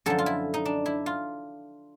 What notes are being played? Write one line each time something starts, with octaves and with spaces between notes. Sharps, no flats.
F#2 D3 F3 A4
F4
E4
D#4
D4
E4
F4